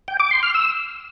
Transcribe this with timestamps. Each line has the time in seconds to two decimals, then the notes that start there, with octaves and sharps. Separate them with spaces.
0.08 G5
0.20 D6
0.31 C6
0.43 F6
0.54 E6